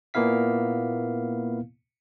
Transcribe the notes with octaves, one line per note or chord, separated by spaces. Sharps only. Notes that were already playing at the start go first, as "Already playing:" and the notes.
A#2 A#3 B3 E4 F5 B6